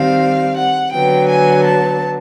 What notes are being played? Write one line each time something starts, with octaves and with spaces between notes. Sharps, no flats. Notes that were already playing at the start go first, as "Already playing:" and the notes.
Already playing: D#3 G3 C4 F5
F#5
D3 F#3 B3 G5
G#5
A5